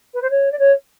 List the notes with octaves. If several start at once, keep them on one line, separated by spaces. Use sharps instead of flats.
B4
C5
C#5
D5
C#5